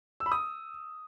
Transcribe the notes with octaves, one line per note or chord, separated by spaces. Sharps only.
E6
B5
D#6